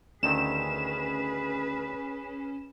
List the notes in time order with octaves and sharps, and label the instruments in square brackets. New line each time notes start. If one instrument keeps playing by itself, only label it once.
[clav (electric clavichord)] D2 D#3 C4 [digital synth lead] C#4 [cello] G#4 B4 [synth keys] E7